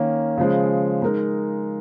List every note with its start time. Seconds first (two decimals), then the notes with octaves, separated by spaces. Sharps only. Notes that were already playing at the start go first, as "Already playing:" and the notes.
Already playing: D#3 A#3 C#4
0.38 C#3 F3 G#3
1.02 G#3 D#4 A#4